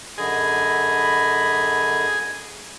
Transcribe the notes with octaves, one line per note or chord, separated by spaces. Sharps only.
F#2 D3 G#4 D#5 B5